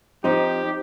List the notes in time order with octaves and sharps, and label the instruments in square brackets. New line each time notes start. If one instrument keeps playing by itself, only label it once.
[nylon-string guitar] F3 C4 C5 [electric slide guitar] D#4 [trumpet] G4